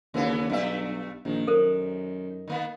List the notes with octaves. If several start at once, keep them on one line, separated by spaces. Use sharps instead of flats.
D#2 C#3 E3 B3
B1 G2 A3 E5
A#1 D#3
F#2 A4 A#4 C5
D#3 A#3 B3